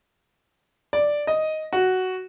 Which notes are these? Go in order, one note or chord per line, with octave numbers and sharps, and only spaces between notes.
D5
D#5
F#4